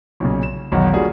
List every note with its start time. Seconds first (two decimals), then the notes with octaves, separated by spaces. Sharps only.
0.20 B1 A#2 C#3
0.43 E7
0.72 E1 B1 D#3 D#4 F#5
0.93 G3 A#3 D4 F4 F#4 G#4